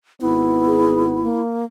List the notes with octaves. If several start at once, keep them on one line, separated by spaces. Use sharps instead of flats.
G#1 B3 E4
G#4
A#3